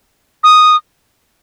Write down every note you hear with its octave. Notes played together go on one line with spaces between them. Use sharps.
D#6